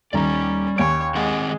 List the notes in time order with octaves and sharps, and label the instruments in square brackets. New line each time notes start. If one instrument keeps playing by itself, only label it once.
[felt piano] D#1 D#3 A#5 [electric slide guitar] G3 D5 [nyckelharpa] C#4
[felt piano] D#2 G#5 D7 [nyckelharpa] C#5
[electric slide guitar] D#3 C4 F#5 [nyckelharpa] G#3